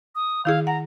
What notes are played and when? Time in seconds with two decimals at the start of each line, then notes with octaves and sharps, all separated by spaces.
0.15 D#6
0.45 D#3 E4 G#4 F5
0.67 F#5 A#5